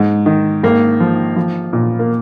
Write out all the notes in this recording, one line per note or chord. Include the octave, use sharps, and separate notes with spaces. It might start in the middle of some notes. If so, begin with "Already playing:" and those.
Already playing: G#2
D#3
G#1 A#3
F3
F3
A#2
A#3